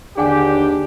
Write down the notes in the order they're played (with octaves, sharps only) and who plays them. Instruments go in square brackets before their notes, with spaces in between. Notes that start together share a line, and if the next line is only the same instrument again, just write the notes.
[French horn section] D#2 D3 [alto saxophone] D4 [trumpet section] G4 [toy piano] G#4 F#5 G#5